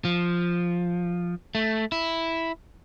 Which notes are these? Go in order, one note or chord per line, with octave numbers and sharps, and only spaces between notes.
F3
A3
E4